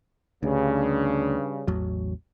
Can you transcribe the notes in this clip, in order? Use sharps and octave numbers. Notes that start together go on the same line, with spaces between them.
D2 G2 C#3
A1 E2 F#3